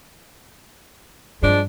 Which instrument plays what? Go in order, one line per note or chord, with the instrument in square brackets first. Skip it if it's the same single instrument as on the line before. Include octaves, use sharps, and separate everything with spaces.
[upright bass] G2 C4 [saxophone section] F3 G#3 D4